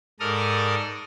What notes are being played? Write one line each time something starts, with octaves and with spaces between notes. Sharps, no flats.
G#2 A4 A#4 D5 D#6 F6